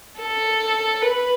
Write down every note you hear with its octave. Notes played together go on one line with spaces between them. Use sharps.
A4
B4